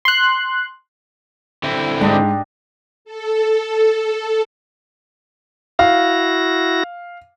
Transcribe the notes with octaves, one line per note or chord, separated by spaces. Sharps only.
C6 F#6
D3 C4 E4
G#2 D4 G4 D#5
A4
E4 F#4 F5 A#6